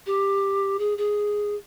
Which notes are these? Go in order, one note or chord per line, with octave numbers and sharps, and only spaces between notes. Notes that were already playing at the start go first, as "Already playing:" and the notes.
G4
G#4
G#4